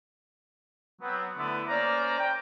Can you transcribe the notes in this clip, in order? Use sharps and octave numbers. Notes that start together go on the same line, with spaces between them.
F#3 B3 C4
D3 A3 B3 E4 A4 B4
A#3 C#4 C5 D5 A#5
G5